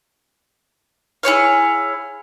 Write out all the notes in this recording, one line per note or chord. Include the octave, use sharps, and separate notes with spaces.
E4 G#4 C#5 F5